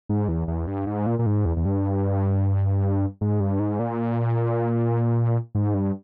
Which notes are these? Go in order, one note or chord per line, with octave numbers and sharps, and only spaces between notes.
G#2
E2
E2
G2
G#2
A#2
A#2
G#2
E2
E2
G2
G#2
G2
G#2
A#2
G#2
G2